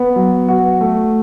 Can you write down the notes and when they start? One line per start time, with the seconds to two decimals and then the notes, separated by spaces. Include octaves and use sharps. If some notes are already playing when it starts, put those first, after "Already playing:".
Already playing: B3
0.16 F#3
0.49 F#4
0.81 A3